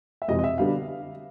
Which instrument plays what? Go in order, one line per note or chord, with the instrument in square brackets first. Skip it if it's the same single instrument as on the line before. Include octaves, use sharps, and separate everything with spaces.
[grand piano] E5
F2 C3 E3 G#3 C4 D#5
D#5
E5
D3 G3 B3 D4 F5